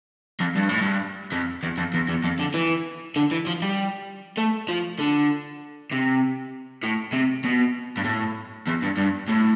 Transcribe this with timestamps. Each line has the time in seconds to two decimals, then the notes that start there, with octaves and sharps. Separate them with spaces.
0.40 F2
0.55 G2
0.69 A2
0.81 G2
1.32 F2
1.63 E2
1.78 F2
1.94 E2
2.09 E2
2.24 F2
2.39 D3
2.54 E3
3.16 D3
3.31 E3
3.47 F3
3.62 G3
4.38 A3
4.69 F3
4.99 D3
5.91 C3
6.83 A2
7.13 C3
7.45 B2
7.97 G2
8.05 A2
8.67 E2
8.82 G2
8.97 G2
9.28 A2